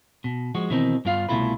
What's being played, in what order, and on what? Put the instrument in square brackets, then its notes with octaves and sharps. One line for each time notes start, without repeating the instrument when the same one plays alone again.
[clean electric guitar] B2
F3 G#3 F#4
B2 D#3 E3 C4 D#4
G2 B3 F4 F5
C2 B2 A3 E4 F4 B4